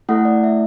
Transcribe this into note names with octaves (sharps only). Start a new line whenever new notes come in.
A3 E4 A4 F#5
D5
E5